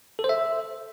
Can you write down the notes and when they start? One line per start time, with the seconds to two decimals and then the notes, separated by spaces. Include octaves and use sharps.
0.19 A4
0.24 C5
0.29 E5